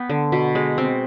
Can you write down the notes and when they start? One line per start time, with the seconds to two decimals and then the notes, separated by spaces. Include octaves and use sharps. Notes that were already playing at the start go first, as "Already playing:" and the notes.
Already playing: B3 G5
0.10 D3
0.32 B2
0.55 G#3
0.78 C4